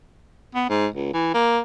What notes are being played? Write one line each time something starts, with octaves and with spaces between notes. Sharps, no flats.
B3
G#2
C#2
E3
A#3